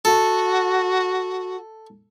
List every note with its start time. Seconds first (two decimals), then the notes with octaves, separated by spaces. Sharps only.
0.05 F#4 A4